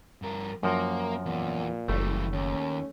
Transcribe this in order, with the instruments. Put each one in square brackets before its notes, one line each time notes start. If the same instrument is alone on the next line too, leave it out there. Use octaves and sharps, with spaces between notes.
[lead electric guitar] G2 A#4
[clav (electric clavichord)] F#2 F3 F#4 [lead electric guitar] A#3
[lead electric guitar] E2 [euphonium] A#2
[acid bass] F#1 [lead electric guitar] E3 G3 [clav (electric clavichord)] A3
[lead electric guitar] D#2 [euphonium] C#4